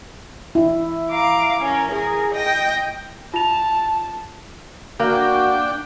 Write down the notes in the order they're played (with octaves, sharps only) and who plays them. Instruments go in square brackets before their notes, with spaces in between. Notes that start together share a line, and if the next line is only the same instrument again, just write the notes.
[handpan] E4
[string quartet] F5 A#5 D6
C#4 A#4
G#4 A#4
D#5 G5 A#6
[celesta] F4 F7 [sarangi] A5
[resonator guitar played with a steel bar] A#3 [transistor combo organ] D4 G5 [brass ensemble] F#4